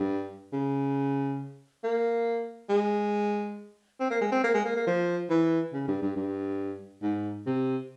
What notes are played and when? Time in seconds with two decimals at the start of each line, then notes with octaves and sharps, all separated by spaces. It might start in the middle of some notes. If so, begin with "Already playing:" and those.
Already playing: G2
0.53 C#3
1.84 A#3
2.69 G#3
4.00 C4
4.10 A#3
4.21 G#3
4.32 C4
4.44 A#3
4.54 G#3
4.65 A#3
4.76 A#3
4.87 F3
5.30 E3
5.73 C#3
5.88 G2
6.02 G2
6.16 G2
7.03 G#2
7.46 C3